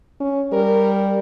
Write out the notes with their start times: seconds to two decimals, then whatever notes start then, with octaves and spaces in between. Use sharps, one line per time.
0.20 C#4
0.53 G3 A#4